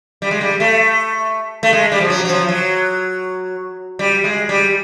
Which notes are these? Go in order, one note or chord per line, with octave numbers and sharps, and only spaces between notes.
G3
G#3
G3
A3
A3
G#3
G3
F3
F#3
F#3
F3
F#3
G3
G#3
G3